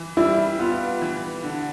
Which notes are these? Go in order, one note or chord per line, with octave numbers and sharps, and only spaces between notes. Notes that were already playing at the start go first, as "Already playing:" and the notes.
Already playing: E3
G3 E4
B3 F4
E3
D3